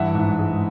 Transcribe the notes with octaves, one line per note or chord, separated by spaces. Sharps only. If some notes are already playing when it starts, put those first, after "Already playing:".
Already playing: G2 E3 E5 F#5
G#2
G#3